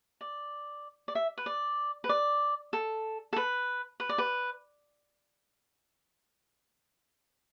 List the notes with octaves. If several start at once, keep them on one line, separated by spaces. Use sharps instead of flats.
D5
D5
E5
B4
D5
B4
D5
A4
A4
B4
B4
D5
B4